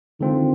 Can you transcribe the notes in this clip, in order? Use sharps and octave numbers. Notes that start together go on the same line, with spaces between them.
D3 D#3 G#3 C4 F4